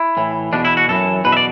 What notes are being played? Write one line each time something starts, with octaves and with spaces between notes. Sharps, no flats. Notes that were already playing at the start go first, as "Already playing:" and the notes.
Already playing: E4
A2 E3
E2 B2 D4
E4
F#4
F#2 E3 A4
E2 B2 B4
E5
D5